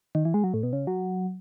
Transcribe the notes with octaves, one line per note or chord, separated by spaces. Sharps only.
D#3
E3
G#3
F#3
A2
B2
C#3
F#3